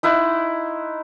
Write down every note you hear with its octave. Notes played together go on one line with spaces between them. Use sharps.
D#4 E4 F#5 C6